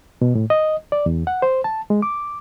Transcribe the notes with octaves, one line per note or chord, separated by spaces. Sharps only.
B2
A2
D#5
D5
E2
F#5
C5
A5
G#3
D6